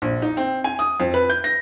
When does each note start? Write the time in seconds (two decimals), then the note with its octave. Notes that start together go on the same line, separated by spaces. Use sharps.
0.02 A#1
0.22 D#4
0.37 C4
0.64 G#5
0.79 D#6
1.00 F2
1.14 B4
1.29 G6
1.44 A#6